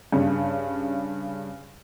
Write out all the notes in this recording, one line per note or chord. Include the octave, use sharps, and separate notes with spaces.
G2 C#3